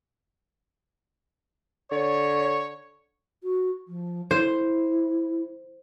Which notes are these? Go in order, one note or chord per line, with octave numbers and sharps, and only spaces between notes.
D3 C#5
F#4
F3
E4 C5